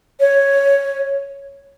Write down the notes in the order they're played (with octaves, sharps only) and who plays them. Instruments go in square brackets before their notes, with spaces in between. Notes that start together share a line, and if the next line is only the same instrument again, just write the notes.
[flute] C#5